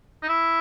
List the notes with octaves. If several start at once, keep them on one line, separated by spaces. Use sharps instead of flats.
D#4
E4